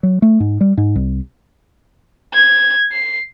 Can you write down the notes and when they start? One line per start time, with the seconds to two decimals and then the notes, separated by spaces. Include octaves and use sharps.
0.03 F#3
0.22 A3
0.40 G#2
0.61 G3
0.77 G#2
0.96 C2
2.33 G#6
2.92 C7